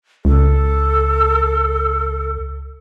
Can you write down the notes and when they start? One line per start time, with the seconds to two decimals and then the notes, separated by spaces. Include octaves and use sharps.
0.25 C#2 A4